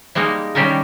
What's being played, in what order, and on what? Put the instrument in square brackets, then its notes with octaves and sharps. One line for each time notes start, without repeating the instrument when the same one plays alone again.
[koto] G3 G#3 A#3 D#4 A#4
D#3 G3 C#4 G4 A4 A#4